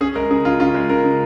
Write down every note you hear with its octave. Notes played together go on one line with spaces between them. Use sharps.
C#4 G#4
G#3 A#4
C#3 G#4
C#3 F4
C#4 F4
G#3
C#3 A#4
C#3